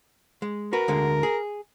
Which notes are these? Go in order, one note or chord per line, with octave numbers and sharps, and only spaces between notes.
G#3
F#4 A#4 B4
D2 D3 G#3
G#4